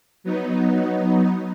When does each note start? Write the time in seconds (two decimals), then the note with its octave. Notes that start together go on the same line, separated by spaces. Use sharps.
0.24 F#3 B3 D#4